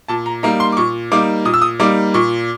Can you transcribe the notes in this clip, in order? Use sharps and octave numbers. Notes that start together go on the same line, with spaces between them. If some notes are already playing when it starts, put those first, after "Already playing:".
A#2 A5
A#5
G3 A#3 D#4 A#5
C6
D6
A#2 C#6
G3 A#3 D#4 D6
A#2 D#6
E6
D#6
G3 A#3 D#4 D6
A#2 C#6